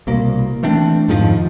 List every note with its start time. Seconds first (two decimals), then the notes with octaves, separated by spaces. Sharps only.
0.07 C2 B2 A#3
0.63 E3 A3 C4 D4
1.08 F2 G#2 D#3 F3